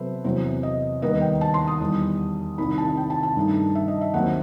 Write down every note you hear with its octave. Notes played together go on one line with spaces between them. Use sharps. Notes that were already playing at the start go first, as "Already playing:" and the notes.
Already playing: C3 F#3 B3 A4 B4 C5 E5
E2 C3 F#3 C5
D#5
D#2 D#3 G3 B3 D#4 D#5
G5
A5
C6
D#6
E2 D#3 G3
C2 C3 D#3 B5
A5
G5
A5
A5
G2 D#3 A3 D#4
E5
D#5
E5
D#2 D#3 F#3 C4 F#5